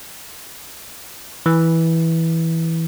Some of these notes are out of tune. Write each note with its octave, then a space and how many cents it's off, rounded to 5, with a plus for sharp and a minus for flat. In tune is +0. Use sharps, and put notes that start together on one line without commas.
E3 -10